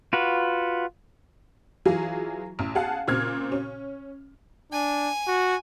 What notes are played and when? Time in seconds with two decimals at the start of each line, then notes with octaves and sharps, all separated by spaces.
0.13 F4 F#4 B4
1.85 E3 F#3 F4 G#4
2.59 A1
2.75 G#4 F5 F#5 A5
3.07 A#2 C#3 C4 F6 G#6
3.52 C#4
4.72 D4 G#5
5.27 F#4